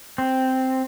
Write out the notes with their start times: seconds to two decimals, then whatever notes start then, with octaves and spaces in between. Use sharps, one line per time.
0.18 C4